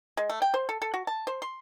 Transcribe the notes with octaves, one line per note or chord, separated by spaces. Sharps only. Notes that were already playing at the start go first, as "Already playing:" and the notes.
G#3
A3
G5
C5
A4
A4
F#4
A5
C5
C6